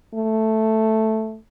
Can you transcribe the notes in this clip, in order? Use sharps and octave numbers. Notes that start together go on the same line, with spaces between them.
A3